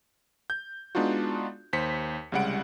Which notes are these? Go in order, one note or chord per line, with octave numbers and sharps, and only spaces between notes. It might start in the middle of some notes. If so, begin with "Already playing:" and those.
G6
G#3 B3 D4 D#4 F4 F#4
D#2 C5 B6 C#7
C2 C#3 G3 G#3 F#5 D7